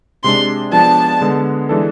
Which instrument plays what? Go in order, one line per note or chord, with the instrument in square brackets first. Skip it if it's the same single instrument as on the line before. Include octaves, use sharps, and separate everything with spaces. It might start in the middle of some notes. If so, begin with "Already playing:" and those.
[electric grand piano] C3 G#3 D4 [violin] C6
[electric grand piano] F3 G#3 B3 D4 [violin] A5
[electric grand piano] D3 G#3 B3
E3 G#3 D4 A4